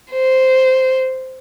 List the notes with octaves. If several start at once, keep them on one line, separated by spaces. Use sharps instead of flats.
C5